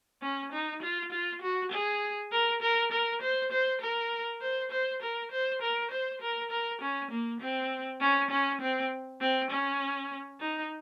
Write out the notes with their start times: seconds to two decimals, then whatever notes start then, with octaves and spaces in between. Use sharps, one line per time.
0.22 C#4
0.52 D#4
0.82 F4
1.12 F4
1.42 F#4
1.72 G#4
2.32 A#4
2.62 A#4
2.92 A#4
3.22 C5
3.52 C5
3.82 A#4
4.41 C5
4.71 C5
5.02 A#4
5.32 C5
5.62 A#4
5.91 C5
6.21 A#4
6.51 A#4
6.81 C#4
7.11 A#3
7.41 C4
8.01 C#4
8.31 C#4
8.61 C4
9.21 C4
9.51 C#4
10.40 D#4